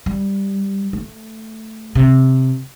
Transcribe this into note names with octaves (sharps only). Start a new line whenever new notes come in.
G3
A3
C3